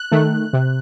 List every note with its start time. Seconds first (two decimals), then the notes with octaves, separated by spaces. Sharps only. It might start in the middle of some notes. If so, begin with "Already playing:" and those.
Already playing: F#6
0.12 D#3 A3
0.53 C3